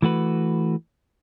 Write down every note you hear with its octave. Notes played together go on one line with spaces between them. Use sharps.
E3 A3 F#4 B4